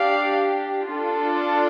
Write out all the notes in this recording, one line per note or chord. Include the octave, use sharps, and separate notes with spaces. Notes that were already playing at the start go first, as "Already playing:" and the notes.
Already playing: D4 G4 D5 F5
D4 F4 A4